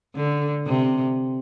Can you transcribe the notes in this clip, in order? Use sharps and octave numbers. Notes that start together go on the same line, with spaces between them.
D3
C3